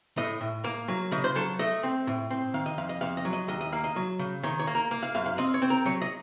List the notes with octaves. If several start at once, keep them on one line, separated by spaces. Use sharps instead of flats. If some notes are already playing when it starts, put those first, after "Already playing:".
A2 D#5
A2
A#3
F#3
C#3 D#5
C5
F#3 A4
A3 D#5
C4
A2
C4
D#3 F5
D#5
F2 F5
D#5
F2 F5
D#5
F#3
D#5
D#2 D#5
D#5
A#3 F5
D#5
F#3
C#3
D#3 C#5
C#5
A#3
A#4
A#3
F5
F#2 F5
F5
C4 D#5
C#5
C4
A#4
F#3 C#5
D#5